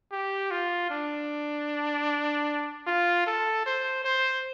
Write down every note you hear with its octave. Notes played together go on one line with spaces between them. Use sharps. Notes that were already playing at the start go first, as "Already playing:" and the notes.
G4
F4
D4
F4
A4
C5
C5